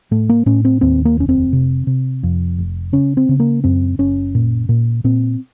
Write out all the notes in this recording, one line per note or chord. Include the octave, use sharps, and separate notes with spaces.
A2 A3
A#3
A2 C#4
C4
D#2 C4
A#3
F1 C#4
C4
C3
C3
F2
F1
C#3 C#4
C4
C#3
A#3
F#2 C4
F#1 C#4
A#2
A#2
A#2 C4